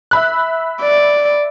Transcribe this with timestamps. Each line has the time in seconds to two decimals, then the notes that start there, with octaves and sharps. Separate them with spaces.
0.11 E5 B5 F#6
0.82 D5